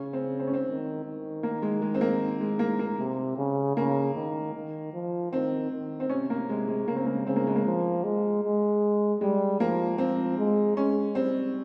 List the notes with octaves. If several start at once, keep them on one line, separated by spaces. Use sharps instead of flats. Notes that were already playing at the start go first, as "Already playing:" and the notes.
Already playing: C#3 C#4
C4
C4
C#4
C4
D#3
D#3
A#3
G#3
G#3
C4
A#3
G#3
A#3
A#3
C3
C#3
C#3 A#3
D#3
D#3
F3
D#3 C4
D#3
C4
C3 C#4
A#3
C3 G#3
G#3
C#3 A#3
C4
A#3
C#3 C4
A#3
G#3
A#3
F3
G#3
G#3
G3 G#3
F3 A#3
F3 C4
G#3
G#3 C#4
G3 C4